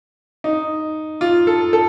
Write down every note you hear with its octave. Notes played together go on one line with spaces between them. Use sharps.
D#4
F4
A4
A4